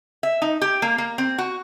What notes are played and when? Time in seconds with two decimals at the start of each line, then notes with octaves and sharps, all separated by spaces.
0.23 E5
0.42 D#4
0.62 G4
0.82 A#3
0.98 A#3
1.18 C4
1.38 F#4